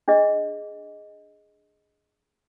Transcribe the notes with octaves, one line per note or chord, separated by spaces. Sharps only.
D4 G#4 D#5